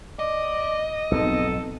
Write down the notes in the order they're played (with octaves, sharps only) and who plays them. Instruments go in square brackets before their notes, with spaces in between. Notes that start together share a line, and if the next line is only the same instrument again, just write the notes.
[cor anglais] D5 [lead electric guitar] D#5
[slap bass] B1 F2 G#2 [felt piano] B3 C4 D#4 [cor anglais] A4